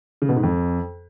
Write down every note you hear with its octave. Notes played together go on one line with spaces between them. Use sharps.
C#3
B2
G#2
F2